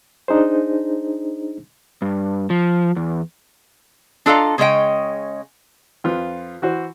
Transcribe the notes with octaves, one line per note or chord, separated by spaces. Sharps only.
D4 D#4 G#4 C5
G2
F3
E2
D4 F4 A4 D#5 F5 A#5
C#3 G#3 C#4 D#5 G5
F2 F4 B4
E3 F#4 C5